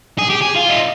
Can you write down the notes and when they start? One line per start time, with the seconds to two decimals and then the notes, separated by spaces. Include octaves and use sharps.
0.19 G#4
0.30 G4
0.41 G#4
0.56 F4
0.69 D#4